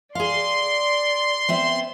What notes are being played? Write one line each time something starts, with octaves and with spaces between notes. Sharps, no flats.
G#4 D5 F5 C6
B3 C4 E5